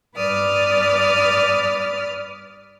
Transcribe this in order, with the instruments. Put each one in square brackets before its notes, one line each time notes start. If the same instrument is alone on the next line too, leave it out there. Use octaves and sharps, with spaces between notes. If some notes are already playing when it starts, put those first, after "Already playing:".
[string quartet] G2 B4 D5 D6 D#6 F6